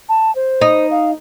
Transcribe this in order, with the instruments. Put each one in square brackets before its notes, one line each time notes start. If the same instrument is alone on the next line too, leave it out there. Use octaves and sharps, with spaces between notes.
[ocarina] A5
C5
[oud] D#4
[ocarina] F5